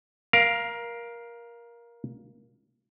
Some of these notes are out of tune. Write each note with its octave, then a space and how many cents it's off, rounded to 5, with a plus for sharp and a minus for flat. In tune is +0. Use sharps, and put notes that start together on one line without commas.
A#4 +20 F5 -5